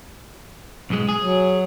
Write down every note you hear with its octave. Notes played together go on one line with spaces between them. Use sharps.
B1 G#3
G#4
F#3